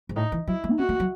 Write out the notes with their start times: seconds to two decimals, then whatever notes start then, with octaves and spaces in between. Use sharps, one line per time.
0.09 G#2
0.16 A2 D#4
0.32 E3
0.47 F#3 E4
0.64 G#3
0.72 D#4
0.79 C#4 F#4
0.89 A3
1.00 F#3